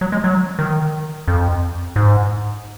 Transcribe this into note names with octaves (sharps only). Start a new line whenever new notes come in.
F#3
G#3
F#3
D#3
F2
G#2